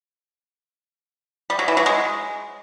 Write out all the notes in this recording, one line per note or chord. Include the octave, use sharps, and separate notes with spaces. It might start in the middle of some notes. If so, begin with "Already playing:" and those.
G3
F#3
E3
F#3
G#3